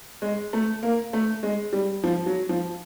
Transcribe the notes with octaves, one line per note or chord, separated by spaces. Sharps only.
G#3
A3
A#3
A3
G#3
G3
F3
F#3
F3